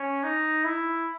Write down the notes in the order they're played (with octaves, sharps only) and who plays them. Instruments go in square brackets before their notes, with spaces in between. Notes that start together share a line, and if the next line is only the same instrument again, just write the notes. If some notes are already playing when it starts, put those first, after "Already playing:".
Already playing: [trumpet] C#4
D#4
E4